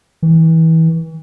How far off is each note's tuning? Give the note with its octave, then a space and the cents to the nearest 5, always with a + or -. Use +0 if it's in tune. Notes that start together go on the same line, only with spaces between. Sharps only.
E3 -30